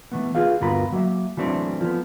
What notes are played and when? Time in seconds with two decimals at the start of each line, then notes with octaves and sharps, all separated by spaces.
0.12 E3 A3 B3
0.35 F4 G#4 B4 F5
0.61 D2 G2 B3 F4 A#4 B5
0.92 F#3 A#3 E5
1.37 E3 F#3 A3 C4 D4
1.80 F3 B3